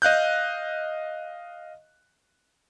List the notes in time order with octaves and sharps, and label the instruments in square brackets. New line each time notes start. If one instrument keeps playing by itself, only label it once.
[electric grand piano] D#5 F5 F#6 G6